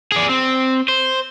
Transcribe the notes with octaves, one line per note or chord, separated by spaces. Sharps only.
G#4 D5
C4
C5